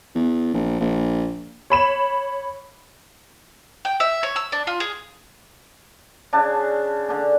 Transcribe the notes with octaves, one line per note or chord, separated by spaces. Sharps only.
E2
A#1
A#1
C#5 B5 E7
G5
E5
C#5
E6
D4
F4
G#4
C#3 D4 A5
D3 D4